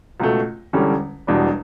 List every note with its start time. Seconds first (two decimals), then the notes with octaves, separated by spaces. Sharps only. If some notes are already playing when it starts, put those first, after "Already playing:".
0.20 C#2 B2 A3
0.73 E1 E2 D3 G3 C#4
1.27 E1 E2 B2 G3 D4